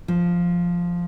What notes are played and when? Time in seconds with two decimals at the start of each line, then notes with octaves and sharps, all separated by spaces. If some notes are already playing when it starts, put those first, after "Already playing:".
0.08 F3